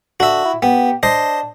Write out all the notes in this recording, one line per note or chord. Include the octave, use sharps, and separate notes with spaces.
D3 F#4 E5
E4
B3 G4
D4 C5 D#5